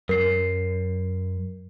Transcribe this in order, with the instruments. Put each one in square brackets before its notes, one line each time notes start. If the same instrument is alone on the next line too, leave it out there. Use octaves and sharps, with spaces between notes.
[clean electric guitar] F#2 [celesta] A#4 C7